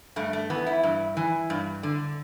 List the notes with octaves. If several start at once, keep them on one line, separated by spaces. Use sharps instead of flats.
G2 A3
A3
E3 B3
E4
G2
E3
G2
D3